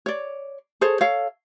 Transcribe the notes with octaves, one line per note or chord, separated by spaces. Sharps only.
C#5 D5
G#4 A4 C5 C#5
A4 C#5 F5